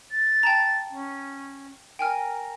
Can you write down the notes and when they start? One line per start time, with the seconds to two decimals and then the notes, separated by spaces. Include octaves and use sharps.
0.11 A6
0.43 G5 A5 A#5
0.90 C#4
1.99 A#4 G5 G#5 F6